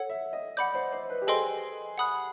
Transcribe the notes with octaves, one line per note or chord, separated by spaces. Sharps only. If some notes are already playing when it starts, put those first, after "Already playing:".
Already playing: A4 C#5 F#5
E5
D#5
D5 F#5 B5 D6 G6
C5
C5
B4
G4
G#4 A4 C5 D#5 G5 C6
F#5 B5 D#6 F#6